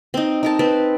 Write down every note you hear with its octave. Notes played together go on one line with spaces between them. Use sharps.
C4 D#4
D#4 A#4 A5
C4 B4 A5